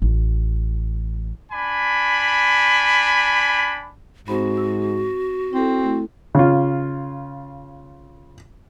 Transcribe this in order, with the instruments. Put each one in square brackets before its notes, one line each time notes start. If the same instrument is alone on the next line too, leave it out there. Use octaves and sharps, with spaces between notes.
[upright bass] A1
[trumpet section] D4 G#5 B5
[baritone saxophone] G#2 [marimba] C4 C5 B5 [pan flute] F#4
[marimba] E6
[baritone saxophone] C4 [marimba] E4 A4
[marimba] A3 E4
[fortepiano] C#3 F4